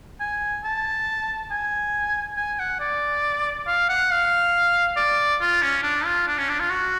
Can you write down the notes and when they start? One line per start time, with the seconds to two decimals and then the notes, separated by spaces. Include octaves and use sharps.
0.20 G#5
0.64 A5
1.51 G#5
2.37 G#5
2.59 F#5
2.80 D5
3.67 F5
3.89 F#5
4.11 F5
4.97 D5
5.41 F4
5.62 C#4
5.83 D4
6.05 F4
6.27 D4
6.38 C#4
6.49 D4
6.60 F4
6.70 F#4